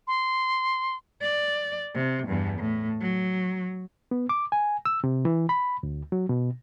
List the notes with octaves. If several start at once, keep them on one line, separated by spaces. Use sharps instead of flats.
C6
D5
C3
E2 G2
A2
F#3
B3
D6
G#5
E6
C3
E3
B5
D2
F#3
B2